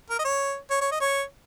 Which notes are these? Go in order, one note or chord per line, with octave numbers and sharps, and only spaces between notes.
A#4
D#5
C#5
C#5
C#5
D#5
C#5